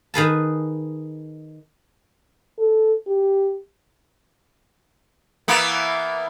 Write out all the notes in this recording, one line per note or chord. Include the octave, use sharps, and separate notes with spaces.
D#3 G#4 B4 A5
A4
G4
E3 A#3 B3